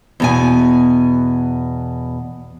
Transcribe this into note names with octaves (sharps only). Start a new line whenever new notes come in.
E2 B2 G#5